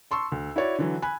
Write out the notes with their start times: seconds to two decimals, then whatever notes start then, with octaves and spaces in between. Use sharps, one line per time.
0.11 A5 C6 C#6 E6
0.32 D2
0.56 E4 F#4 C#5 D5
0.79 D3 E3 F#3
1.02 G#5 B5 F#6